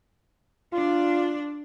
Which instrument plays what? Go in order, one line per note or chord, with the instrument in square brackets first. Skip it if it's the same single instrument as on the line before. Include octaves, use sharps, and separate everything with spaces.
[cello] D4 D5 [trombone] F4